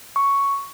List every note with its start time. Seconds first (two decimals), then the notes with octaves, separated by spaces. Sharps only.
0.16 C#6